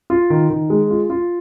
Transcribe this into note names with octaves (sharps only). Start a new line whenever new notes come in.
F4
D#3
D#3
G#3
F4
F4